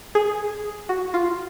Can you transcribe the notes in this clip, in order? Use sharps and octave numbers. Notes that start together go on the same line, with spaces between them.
G#4
F#4
F4